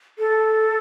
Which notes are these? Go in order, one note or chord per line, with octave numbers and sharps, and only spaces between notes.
A4